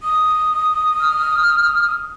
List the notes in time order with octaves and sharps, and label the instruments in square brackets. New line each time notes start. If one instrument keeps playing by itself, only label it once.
[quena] D#6
[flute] F6